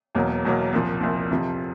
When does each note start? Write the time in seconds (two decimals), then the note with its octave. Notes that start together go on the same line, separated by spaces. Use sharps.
0.15 E1 E2 B2 F#3 A#3
0.44 E1 E2 B2 F#3 A#3
0.73 C2 A#2 F3
1.01 C2 A#2 F3
1.30 F2 C3 F3